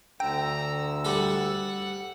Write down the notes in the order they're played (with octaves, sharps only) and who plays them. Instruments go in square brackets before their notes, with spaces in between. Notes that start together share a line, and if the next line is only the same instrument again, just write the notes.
[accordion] D2 D3 E6 [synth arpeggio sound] G5 [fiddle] A#5
[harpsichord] G3 A4 [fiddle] F#5